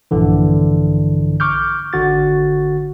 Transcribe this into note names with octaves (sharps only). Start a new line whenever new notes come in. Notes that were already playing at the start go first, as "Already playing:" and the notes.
A#1 G2 D3 E3
C#6 D6 F6 G6
G#1 D3 F#4 A6